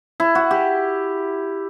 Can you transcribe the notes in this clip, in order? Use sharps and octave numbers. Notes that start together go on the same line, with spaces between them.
E4
F#4
G4